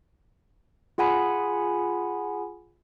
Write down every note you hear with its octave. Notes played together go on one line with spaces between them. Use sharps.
F4 G#4 F#5 G#5 B5